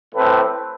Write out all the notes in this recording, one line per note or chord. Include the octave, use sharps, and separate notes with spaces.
A2 E3 A3 C4 B4